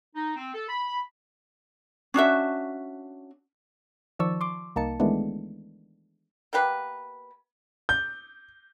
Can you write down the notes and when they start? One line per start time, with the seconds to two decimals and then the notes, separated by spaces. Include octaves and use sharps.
0.15 D#4
0.36 C4
0.53 A4
0.68 B5
2.14 C#4 D4 F#4 E5
4.19 D#3 F3 D5 A5 C#6 E6
4.41 C6 D6
4.76 C2 A#3 D#4 A5 C#7
5.00 D#3 E3 G#3 A3 B3 D4
6.53 A#3 B3 G4 B4
7.89 G6